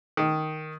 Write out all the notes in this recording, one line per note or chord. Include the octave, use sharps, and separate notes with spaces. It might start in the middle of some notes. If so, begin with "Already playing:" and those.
D#3